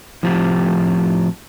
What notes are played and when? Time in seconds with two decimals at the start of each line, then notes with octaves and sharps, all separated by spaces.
0.23 A2 F3 C4 F4 G4